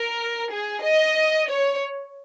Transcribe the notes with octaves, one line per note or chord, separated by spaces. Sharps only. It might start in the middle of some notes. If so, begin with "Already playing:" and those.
Already playing: A#4
G#4
D#5
C#5